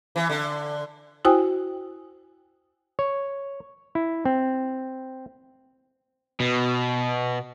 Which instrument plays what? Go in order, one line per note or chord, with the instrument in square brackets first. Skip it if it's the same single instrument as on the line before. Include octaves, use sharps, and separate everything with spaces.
[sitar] E3
D3
[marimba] E4 F#4 C5 G5 G#5 D#6
[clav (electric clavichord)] C#5
E4
C4
[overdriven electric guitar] B2